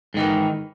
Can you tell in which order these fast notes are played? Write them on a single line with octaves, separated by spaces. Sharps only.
G#2 D#3 E3